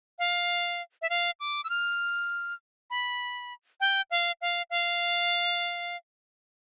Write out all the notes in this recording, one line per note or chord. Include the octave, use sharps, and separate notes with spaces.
F5
E5
F5
D6
E6
F6
B5
G5
F5
F5
F5